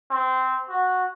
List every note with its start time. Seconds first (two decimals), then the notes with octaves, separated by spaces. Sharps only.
0.10 C4
0.69 F#4